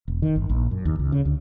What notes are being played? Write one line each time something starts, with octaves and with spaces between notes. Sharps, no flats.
E1
D#3
G1
A#1
F#2
D#2
C#2
C#3
D2